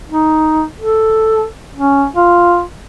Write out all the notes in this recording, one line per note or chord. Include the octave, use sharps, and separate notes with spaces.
D#4
A4
C#4
F4